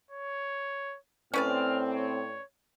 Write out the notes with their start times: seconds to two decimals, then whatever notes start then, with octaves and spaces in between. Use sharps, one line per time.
0.11 C#5
1.34 A2 C4 C#4 B4 D5 F6
1.94 C#5